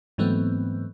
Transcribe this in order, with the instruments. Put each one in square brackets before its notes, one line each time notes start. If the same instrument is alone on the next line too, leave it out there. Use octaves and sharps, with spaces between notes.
[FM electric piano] G#2 E3 F#3 A3 B3 C4